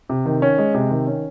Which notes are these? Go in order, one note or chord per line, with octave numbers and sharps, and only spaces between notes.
C3
D#3
C#4
G#3
C3
D#3
C#4